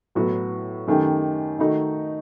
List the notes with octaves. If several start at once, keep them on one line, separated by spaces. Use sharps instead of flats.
A2 F#3 B3 F#4 B4
F#2 D#3 A3 D#4 G4
D#3 A3 D#4 F#4